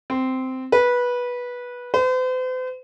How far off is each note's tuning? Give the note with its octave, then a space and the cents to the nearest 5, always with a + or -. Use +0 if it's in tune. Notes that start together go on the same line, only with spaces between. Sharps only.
C4 -10
B4 -15
C5 -45